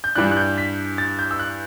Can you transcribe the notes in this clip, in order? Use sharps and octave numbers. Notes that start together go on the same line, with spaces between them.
G6
G2 E3 G3 D4 F#6
F#6
G6
B6
A6
G6
E6
F#6